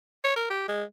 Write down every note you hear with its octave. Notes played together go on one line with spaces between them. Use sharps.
C#5
A#4
G4
G#3